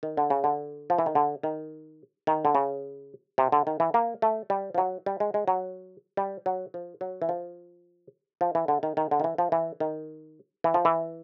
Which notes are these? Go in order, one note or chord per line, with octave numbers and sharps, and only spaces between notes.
D#3
D3
C#3
D3
F3
E3
D#3
D3
D#3
D#3
D3
C#3
C3
D3
D#3
E3
A#3
A3
G3
F3
F#3
G3
G#3
G#3
F#3
G3
F#3
F3
F#3
E3
F3
F3
E3
D3
D#3
D#3
D3
D#3
E3
F3
E3
D#3
E3
F3
E3